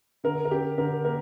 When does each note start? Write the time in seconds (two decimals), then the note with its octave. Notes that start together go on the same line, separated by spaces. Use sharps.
0.24 D3 A#4
0.45 A#4
0.51 C#4 G4
0.78 D3 A#4
1.05 A#3 A#4